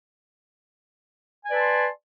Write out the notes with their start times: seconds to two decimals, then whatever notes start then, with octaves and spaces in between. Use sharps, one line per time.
1.45 G#5
1.48 D5
1.51 B4
1.54 A5
1.58 C6